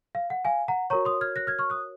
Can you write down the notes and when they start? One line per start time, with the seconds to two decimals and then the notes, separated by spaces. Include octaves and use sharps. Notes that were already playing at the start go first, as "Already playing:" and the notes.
0.15 F5
0.30 F#5
0.45 F5 G#5
0.68 F#5 A#5
0.90 F#4 A#4 C#5 A#5 C#6
1.05 C6 D#6
1.21 F6 G#6
1.36 F#6 A#6
1.47 F6 G#6
1.59 C#6 F6
1.70 D#6 F#6